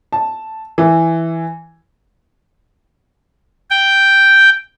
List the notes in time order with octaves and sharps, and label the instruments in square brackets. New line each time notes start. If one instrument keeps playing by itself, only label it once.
[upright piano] A5
E3
[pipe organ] G5